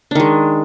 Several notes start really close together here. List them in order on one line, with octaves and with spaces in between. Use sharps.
D4 D#3 G#3